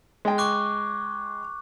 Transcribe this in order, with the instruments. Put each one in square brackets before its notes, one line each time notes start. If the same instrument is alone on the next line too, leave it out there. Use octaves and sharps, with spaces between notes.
[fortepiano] G#3 G5
[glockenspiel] C#6 D6 F#6